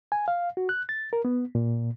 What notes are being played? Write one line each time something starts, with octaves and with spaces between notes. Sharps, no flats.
G#5
F5
F#4
F#6
A6
A#4
B3
A#2